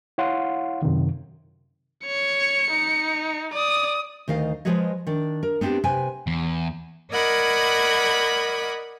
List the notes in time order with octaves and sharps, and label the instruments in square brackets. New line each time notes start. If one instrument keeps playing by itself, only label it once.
[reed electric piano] E4 C#5 F5 F#5 C6
F#2 C3 D#3
[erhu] C#5 [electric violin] C#7
[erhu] D#4
[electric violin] D5 [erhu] D#6
[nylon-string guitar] D2 D#3 D#5 F5
F3 G#3 G#4 B4 C#5 D#5
D#3 D4
A#4
B3 C4 D4 F4 G4
C3 B4 G5 G#5
[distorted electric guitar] E2
[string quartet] A#4 D5 D#5 F#5 B5 G#6